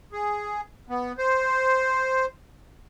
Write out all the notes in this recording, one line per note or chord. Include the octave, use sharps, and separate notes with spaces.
G#4
B3
C5